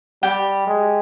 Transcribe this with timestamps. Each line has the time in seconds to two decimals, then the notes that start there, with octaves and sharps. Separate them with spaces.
0.23 G3 G4
0.67 G#3